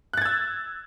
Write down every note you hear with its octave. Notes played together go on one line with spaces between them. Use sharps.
E6 F#6 G#6 A6